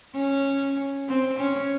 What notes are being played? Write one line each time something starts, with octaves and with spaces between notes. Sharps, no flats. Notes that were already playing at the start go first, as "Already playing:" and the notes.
C#4
C4
C#4